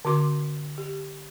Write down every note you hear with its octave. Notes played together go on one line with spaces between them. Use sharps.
D3 C4 F#4 C6 D6
G4